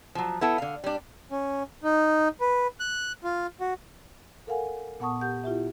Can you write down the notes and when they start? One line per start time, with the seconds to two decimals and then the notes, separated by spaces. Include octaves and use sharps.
0.15 F3 F#3
0.41 B3 E4 A4
0.58 D3 F5
0.84 G3 D4
1.31 C#4
1.83 D#4
2.41 B4
2.80 F#6
3.24 F4
3.60 F#4
4.47 A4 A#4 F5 F#5 G#5
5.00 A#2 B3 F#5 A5 C#6 D#6
5.21 G4 F#5 G6
5.44 E4 F4 G4 E5